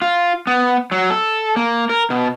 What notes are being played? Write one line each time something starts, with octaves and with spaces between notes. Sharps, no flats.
F4
B3
F#3
A4
A#3
A#4
B2